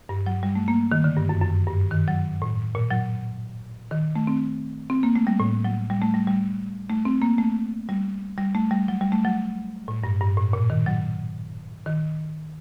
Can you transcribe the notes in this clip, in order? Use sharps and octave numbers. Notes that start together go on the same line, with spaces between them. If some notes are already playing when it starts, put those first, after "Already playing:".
G2
F#3
G3
A3
A#3
D#3
D3
G2
F#2
F#2
G2
D#3
F#3
A2
A#2
F#3
D#3
A3
C4
C4
A#3
A3
G3
A2
F#3
G3
A3
G3
G3
A3
C4
A#3
A3
G3
G3
A3
G3
F#3
G3
A3
F#3
A2
G2
G2
A2
A#2
D#3
F#3
D#3